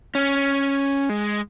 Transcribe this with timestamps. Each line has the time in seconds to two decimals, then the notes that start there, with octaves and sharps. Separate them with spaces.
0.15 C#4
1.09 G#3